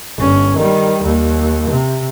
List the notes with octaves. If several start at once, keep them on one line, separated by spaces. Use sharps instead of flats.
G1 C#4
D#3 G3
D#2
C3